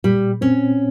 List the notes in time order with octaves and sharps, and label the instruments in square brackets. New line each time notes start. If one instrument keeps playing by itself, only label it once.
[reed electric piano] A#2 [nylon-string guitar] G3
[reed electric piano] C4 [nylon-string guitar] C#4